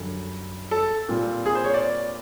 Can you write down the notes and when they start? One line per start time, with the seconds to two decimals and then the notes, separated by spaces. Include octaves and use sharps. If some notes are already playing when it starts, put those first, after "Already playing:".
Already playing: F#2 D3 G3
0.71 A4
1.08 A#2 G3 C4 F4
1.46 G#4
1.55 C5
1.64 C#5
1.74 D5